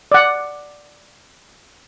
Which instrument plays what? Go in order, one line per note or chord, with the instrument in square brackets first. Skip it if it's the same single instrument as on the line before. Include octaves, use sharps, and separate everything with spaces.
[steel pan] D5 F#5